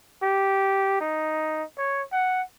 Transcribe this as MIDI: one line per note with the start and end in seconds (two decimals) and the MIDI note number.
0.22 0.97 67
1.01 1.64 63
1.78 2.02 73
2.12 2.42 78